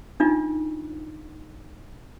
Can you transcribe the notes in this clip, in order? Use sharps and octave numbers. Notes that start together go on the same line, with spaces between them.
D4 D#4 F4